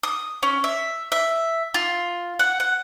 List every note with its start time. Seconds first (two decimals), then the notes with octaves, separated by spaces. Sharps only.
0.03 D#6
0.43 C#4
0.64 E5
1.12 E5
1.74 F4
2.39 F#5
2.60 F#5